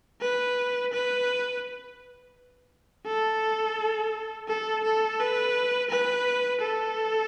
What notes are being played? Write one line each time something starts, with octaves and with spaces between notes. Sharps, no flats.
B4
B4
A4
A4
A4
B4
B4
A4